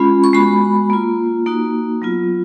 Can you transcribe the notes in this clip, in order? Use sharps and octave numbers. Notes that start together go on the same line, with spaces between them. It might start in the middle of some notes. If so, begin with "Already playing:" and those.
Already playing: G#3 C#4 F4 B5
C#6
G#3 B3 F#4 B5
A#3 F4
A#3 D#4 F#4
F#3 B3 F4